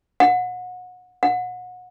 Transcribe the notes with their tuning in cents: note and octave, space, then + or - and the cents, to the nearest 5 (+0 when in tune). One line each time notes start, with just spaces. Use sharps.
F#5 -30
F#5 -30